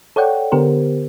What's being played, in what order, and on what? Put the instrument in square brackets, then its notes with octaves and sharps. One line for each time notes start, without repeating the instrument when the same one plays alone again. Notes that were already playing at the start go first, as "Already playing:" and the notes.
[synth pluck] A4 C#5 D5 F#5 G5
D3 B3 G4 A#4 C5